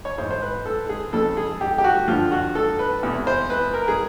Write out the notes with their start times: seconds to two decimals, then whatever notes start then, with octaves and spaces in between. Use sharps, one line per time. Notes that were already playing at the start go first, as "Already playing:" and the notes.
0.05 C#5
0.18 G#2 E3 C5
0.31 C5
0.42 B4
0.66 A4
0.89 G#4
1.13 F2 C#3 F3 A4
1.37 G#4
1.61 G4
1.78 G4
1.84 F#4
2.08 G2 D3 F3 F4
2.32 F#4
2.55 A4
2.79 B4
3.03 E2 C3 E3
3.27 C5
3.50 B4
3.74 A#4
3.88 G#4